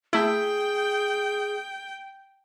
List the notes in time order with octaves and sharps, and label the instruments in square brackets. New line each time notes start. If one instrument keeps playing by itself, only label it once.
[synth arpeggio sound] A3 E4 [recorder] G#4 [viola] G5